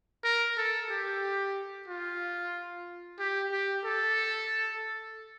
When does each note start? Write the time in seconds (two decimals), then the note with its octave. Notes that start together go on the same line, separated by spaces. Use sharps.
0.24 A#4
0.57 A4
0.89 G4
1.88 F4
3.19 G4
3.51 G4
3.84 A4